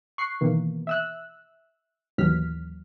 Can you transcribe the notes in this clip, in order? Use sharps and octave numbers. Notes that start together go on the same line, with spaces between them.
C#6 F#6 C7
B2 D#3 E3 A#3
E5 E6 F#6
D#2 A2 E3 F#3 F6 B6